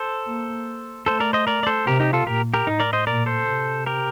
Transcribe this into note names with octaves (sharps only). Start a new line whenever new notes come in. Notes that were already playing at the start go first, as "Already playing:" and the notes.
Already playing: A4 C5
A#3
A3 A4 C5
A#4 D5
C5 D#5
A#4 D5
D5
A4 C5
C3 G4 A#4
D#4 G4
F4 A4
A#2 G4 A#4
G4 A#4
A2 D#4
A#4 D5
C5 D#5
A#2 A#4 D5
A4 C5
C3
G4 A#4